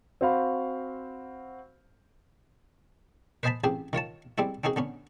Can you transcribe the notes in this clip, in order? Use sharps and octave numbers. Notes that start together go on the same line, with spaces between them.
C4 F#4 C5 F5 B5
B4 C5 D#5 G#5 A5 B5
A1 C4 G4 G#4
D#3 F4 C#5 A5
G3 G#3 C4 E4
C4 C#4 D#4 F#4 G#4
D3 B3 C#4